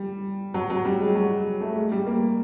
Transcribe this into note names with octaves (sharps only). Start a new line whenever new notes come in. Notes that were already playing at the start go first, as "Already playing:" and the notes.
Already playing: G3
F#3
F#3
G3
G#3
F#3
A3
G#3
G3
A#3